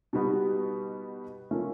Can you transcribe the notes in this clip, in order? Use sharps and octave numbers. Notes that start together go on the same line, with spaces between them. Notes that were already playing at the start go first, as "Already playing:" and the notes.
B2 G3 B3 D#4 F#4
A3 C#4 F4 A#4